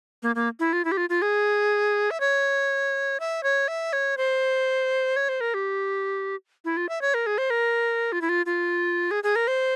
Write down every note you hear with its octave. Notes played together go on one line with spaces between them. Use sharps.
A#3
A#3
E4
F4
E4
G4
F4
F4
G#4
E5
C#5
E5
C#5
E5
C#5
C5
C#5
C5
A#4
G4
E4
F4
E5
C#5
A#4
G#4
C5
A#4
F4
E4
F4
F4
G#4
G#4
A#4
C5